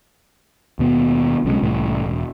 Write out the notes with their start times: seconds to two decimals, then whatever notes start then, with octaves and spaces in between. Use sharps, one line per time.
0.79 D#2 B2 B3
1.45 B1 C#3 F#3 G#3
1.62 C2 A2 E3
2.04 E1